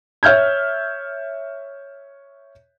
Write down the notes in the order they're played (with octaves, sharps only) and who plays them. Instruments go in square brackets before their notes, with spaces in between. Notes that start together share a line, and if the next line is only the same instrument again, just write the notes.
[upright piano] C#5 E5 F6 G6 G#6